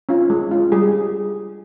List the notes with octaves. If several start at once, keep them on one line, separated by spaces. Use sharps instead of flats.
C#4 F4
G#3
C#4 F4
G3 G#4